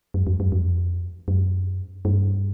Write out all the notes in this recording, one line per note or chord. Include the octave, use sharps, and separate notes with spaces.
F#2
F2
F#2
F2
F#2
G2